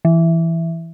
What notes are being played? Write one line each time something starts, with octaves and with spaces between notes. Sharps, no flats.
E3